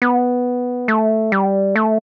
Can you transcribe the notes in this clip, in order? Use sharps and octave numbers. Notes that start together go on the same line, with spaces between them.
B3
A3
G3
A3